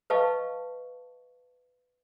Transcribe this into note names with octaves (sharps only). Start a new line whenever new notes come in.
B4 D#5 F5 A5 C#6